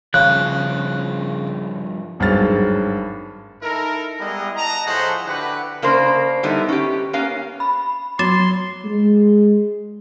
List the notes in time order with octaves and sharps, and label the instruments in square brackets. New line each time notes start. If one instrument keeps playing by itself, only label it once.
[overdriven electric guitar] G2 F3 [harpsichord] C#3 [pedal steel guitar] F#6
[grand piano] G#1 G2 F#3 G#4 F6 A6
[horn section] D#4 E4 A4 A#4
G3 G#3 B3 E4 G#4 D#5
D#5 F#5 A5 A#5
A2 F3 A3 G#4 C5 F#5
D3 E4 F#4 G4 B4 F#5
[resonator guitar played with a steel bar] C#3 A#3 D4 C5
D3 G3 B3 D#4 E4
C#4 G4
A#3 B3 C#4 F5
[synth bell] B5
[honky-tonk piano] F#3 [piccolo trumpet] C6 [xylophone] D6 A6 E7
[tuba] G#3